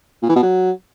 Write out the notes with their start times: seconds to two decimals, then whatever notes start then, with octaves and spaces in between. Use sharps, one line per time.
0.22 A#2
0.29 E3
0.36 B2
0.43 F#3